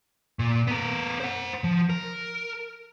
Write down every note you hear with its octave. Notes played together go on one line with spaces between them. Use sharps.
A#2
B3 A#4
C5 F#5
F3
A#4